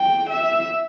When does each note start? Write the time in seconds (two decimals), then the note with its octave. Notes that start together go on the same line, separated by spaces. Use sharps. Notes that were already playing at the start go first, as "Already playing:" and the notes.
Already playing: G5
0.30 E5